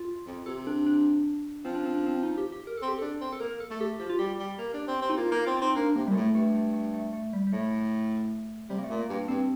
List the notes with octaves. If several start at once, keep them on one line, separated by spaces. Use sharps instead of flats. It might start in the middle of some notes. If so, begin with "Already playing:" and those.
Already playing: F4
F2
C3 A4
D4
D4
F3 C4
D4
C4
D4
C4
D#4
G4
G4
A#4
C4 A4
G4
D4 A4
C4
A4
A#3 A#4
A4
A3 A4
G4
F3 G4
F4
G3 G4
G3
A#3
D4
C4
C4
D#4
A#3 F4
A#3 D#4
C4 F4
F4
C4 D#4
A#3 D4
C3 A#3
A#2 G3
A2 A3
G2 A3
A3
A3
A3
A3
G3
G3
A2 A3
C3 G3
A#3
A3
A#2
A#3
G2 A#3
G2 C4